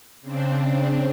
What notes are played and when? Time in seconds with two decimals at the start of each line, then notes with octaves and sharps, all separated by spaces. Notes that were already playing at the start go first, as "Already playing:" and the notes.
0.21 C#3 C4 D4